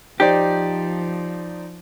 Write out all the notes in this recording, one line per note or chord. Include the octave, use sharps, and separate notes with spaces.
F3 D#4 G4 C5 D5